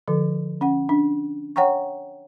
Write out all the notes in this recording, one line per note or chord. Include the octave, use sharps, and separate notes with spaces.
D3 F3 A4
C#4 F#5
D4
C#5 F#5 G5 A#5 C#6